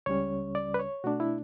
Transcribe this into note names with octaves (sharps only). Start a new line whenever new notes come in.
C#2 C#3 G3 C#4 C#5
D5
B4
C#5
B2 A3 D4 F#4
E4